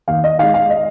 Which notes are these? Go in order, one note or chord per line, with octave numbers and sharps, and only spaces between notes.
D#2 F5
D#5
D#3 G#3 F5
F5
D#5